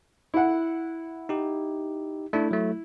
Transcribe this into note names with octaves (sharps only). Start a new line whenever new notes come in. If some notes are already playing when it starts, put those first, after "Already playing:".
E4 F#5
D#4 G4
A3 D4 E4
F#3 A3